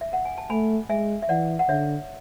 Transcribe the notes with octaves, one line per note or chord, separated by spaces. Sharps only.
E5
F#5
G#5
A5
A3 G#5 B5
G#3 E5 G#5
E5
E3 D5 F#5
F#5
D3 C#5 E5